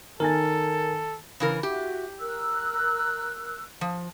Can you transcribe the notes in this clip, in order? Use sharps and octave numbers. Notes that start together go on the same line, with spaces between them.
D#3 A4 A#4 G#5 A6
C#3 E3 A#4
F#4 G4 E5
A#4 E6 F#6
F3